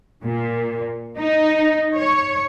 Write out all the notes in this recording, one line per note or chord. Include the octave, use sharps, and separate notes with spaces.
A#2
D#4
C#5